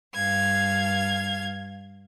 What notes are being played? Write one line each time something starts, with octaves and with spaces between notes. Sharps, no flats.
G2 F5 G#6